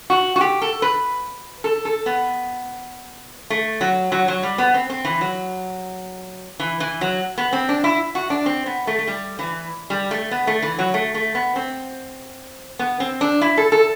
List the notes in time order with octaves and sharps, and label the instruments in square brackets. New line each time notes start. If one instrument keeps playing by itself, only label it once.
[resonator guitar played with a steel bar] F#4
F#4
G4
A4
B4
A4
A4
B3
A3
F#3
F#3
F#3
G3
B3
C4
C4
E3
F#3
E3
E3
F#3
B3
C4
D4
E4
F#4
D4
C4
B3
A3
A3
G3
E3
G3
A3
B3
A3
E3
F#3
A3
A3
B3
C4
B3
C4
D4
E4
A4
A4